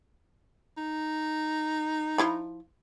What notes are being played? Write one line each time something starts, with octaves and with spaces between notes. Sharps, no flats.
D#4
F3 E4 B5